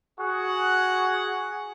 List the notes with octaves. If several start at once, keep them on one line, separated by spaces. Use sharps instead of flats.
F#4 G#4 F#5